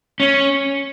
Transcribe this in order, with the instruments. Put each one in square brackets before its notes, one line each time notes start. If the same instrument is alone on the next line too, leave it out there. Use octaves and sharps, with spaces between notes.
[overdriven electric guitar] C#4